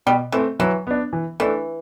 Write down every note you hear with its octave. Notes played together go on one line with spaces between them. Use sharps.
B2 G3
E3 A3 C4
E3 F#3
B3 D4
E3
E3 A3 D4